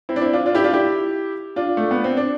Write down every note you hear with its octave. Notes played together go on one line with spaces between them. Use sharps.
C4 E4
D4
C4 E4
D4 F4
D4 F4
E4 G4
D4 F4
E4 G4
D4 F4
A3
B3
C4
D4